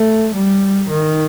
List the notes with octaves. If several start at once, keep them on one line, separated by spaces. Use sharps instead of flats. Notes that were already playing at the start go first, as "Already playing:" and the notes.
Already playing: A3
G3
D#3